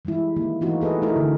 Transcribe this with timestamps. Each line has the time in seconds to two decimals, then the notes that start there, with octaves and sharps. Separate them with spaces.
0.05 E3 G3 G#3 E4
0.36 D#3 A#3
0.61 E3 A3 B3 D#4 F4 F#4
0.81 G#4 A4 B4 D#5
1.02 A3 D#4 E4 A#4
1.16 D3